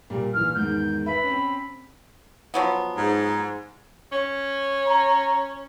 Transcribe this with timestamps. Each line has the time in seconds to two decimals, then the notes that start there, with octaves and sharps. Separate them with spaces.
0.10 A#2 G3 A#3
0.33 A#1 E3 F6
0.55 E2 G#2 D#3 G6
1.06 B4 E5 B5
1.23 C4 C#4
2.54 F3 F#3 B3
2.97 G#2
4.12 C#4
4.85 A#5